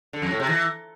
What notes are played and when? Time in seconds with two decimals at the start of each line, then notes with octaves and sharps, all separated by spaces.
0.13 D3
0.22 F2
0.31 A2
0.40 C3
0.49 E3